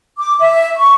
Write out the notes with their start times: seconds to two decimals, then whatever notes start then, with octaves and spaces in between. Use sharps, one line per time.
0.18 D6
0.39 E5
0.77 C#6